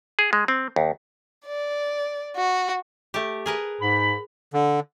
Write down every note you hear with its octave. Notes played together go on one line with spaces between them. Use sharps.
G#4
G#3
C4
D#2
D5
F#4
A3 G4
G#4 A#4 B4
G#2 B5
D3